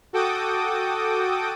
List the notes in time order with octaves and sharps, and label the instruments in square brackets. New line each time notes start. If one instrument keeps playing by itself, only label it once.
[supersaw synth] F#4 A4 G5 D6 D#6